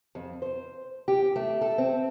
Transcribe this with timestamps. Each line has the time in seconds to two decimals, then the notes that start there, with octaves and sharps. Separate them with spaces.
0.15 F2
0.42 C5
1.08 G4
1.36 A3
1.61 A4
1.78 C4